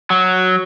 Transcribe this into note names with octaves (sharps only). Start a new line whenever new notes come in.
F#3